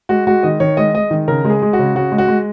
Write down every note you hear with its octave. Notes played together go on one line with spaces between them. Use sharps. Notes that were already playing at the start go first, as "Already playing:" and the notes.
G#3 F#4
G#3 F#4
D#3 D#5
D#3 C#5
G#3 D#5
G#3 D#5
D#3
C#3 A#4
G#3
G#4
G#3
F#4
C#3
C#3 F#4
G#3
F#4
G#3